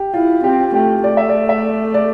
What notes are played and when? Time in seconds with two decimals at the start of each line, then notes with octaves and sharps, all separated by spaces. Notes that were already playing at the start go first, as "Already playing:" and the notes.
Already playing: G4
0.14 E4 F4
0.44 C4 G4
0.74 A3 G4
1.04 A3 D5
1.17 E5
1.29 D5
1.49 E5
1.94 D5